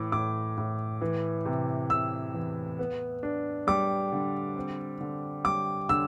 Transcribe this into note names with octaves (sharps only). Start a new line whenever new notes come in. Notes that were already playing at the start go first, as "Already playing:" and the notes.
Already playing: A2 E3 D6
A2 D6
A2
E3
C3
C3 E6
E2
B3
D4
G3 D6
D3
C4
D3
G3 D6
D3 E6